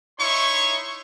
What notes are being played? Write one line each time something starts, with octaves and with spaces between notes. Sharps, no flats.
D#4 E4 C#5 C6 C#6